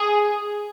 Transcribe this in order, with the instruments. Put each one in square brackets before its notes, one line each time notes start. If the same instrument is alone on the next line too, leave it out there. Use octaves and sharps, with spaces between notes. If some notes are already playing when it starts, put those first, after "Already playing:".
Already playing: [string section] G#4